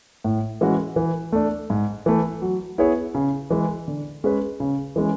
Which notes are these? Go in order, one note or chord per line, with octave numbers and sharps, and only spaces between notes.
A2
E3 G#3 C#4 F#4
E3
A3 D4
G#2
E3 A3
F#3
B3 E4 G#4 C#5
C#3
E3 G#3
D3
G#3 C#4 G#4 B4
C#3
E3 G#3 C#4